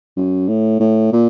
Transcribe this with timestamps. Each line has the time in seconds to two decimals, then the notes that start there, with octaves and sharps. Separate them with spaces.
0.17 F#2
0.49 A2
0.80 A2
1.13 A#2